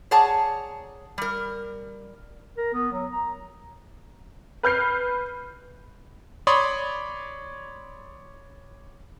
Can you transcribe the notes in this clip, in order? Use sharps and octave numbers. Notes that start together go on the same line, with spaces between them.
G#4 C#5 D5 F#5 A5 A#5
G3 A#4
A#4
B3
F#3
A#5
B4 F6 G6 C7
C#5 D5 B5 C6 D#6